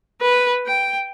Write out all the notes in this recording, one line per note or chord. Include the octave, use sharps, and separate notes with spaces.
B4
G5